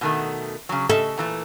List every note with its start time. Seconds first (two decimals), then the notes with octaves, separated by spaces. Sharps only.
0.01 B2 D#3 A3
0.69 C#3 F#3
0.89 C#3 A4 D#5 E5
1.17 A#2 E3 A3